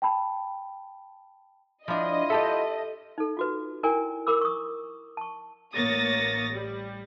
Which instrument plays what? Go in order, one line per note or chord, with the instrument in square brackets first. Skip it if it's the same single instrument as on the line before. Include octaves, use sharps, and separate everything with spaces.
[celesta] G5 A5 B5
[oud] F3 D4 [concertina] E4 F4 [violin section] D#5
[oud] G4 A4 [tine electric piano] E5 A5
[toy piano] D#4 A4
F4 F#4 B4
E4 A#4 D5 G5 G#5
A#4 B5 D6 E6
C#6 D#6
A5 C#6
[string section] A1 A#3 C#5 D#6 A6 A#6
G3